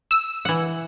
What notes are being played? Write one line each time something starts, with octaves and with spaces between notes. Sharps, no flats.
E6
E3 F#5